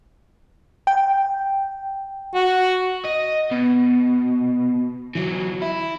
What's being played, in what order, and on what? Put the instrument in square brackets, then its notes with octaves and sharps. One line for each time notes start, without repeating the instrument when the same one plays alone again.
[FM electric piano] G5
[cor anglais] F#4
[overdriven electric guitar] D#5
B2
E3 F#3
E4